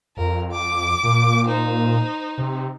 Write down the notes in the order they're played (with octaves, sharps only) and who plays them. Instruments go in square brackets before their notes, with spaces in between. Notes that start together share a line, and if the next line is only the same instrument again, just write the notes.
[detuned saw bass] F2 [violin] A#4
[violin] D6
[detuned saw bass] A#2
[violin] D#4 C5
[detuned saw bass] C3